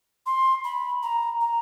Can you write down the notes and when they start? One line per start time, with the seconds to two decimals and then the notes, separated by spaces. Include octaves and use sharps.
0.26 C6
0.64 B5
1.03 A#5
1.41 A#5